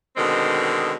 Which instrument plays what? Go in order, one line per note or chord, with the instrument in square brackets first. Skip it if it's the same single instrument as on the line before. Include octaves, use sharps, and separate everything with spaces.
[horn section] B2 D3 D#3 G#3 C4